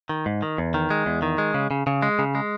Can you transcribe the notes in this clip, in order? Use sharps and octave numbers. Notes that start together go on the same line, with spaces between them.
D#3
G#2
D#3
E2
D#3
G#3
E2
D#3
G#3
C#3
C#3
C#3
G#3
C#3
G#3